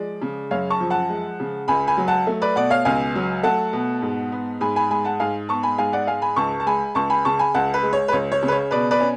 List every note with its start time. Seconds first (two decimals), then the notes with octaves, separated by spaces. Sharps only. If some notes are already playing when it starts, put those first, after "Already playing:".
Already playing: F3 G#3 D5
0.22 C#3
0.51 F#2 C#5 F5
0.70 A5 C#6
0.80 F3
0.90 F#5 A5
1.09 G#3
1.40 C#3
1.68 C#2 G#5 B5
1.87 G#5 B5
1.97 F#3
2.08 F#5 A5
2.27 A3
2.42 B4 D5
2.56 B2 D5 F#5
2.70 C#5 F5
2.85 C#2 F5 G#5
3.15 F#3
3.43 A3 F#5 A5
3.73 B2
4.02 G#2
4.32 B3
4.61 G#2 G#5 B5
4.76 G#5 B5
4.90 G#3 G#5 B5
5.05 F#5 A5
5.20 G#2 F5 G#5
5.49 B3 A5 C#6
5.63 G#5 B5
5.78 G#2 F5 G#5
5.93 D5 F#5
6.07 G#3 F5 G#5
6.22 G#5 B5
6.36 C#2 A5 C#6
6.60 A5
6.66 G#3 G#5 B5
6.95 C#2 A5 C#6
7.10 G#5 B5
7.25 C#3 A5 C#6
7.39 G#5 B5
7.54 C#2 F#5 A5
7.74 B4
7.83 G#3
7.93 C#5
8.08 B4
8.12 C#2 C#5
8.32 C#5
8.43 C#3
8.48 B4
8.52 C#5
8.71 B2 B4 D5
8.91 B4 D5
9.00 C#4